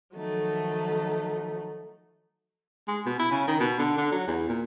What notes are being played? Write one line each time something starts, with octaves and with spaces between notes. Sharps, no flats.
D#3 F3 F#3 A3 D#4
G#3
B2
E4
C#3
D#3
B2
D3
D3
F#3
E2
A#2